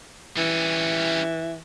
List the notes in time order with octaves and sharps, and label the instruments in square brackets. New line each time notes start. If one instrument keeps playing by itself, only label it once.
[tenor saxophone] E3 [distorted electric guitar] G3 C#4